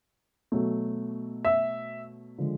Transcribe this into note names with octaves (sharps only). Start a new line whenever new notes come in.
B2 F#3 A3
E5
D3 F3 G#3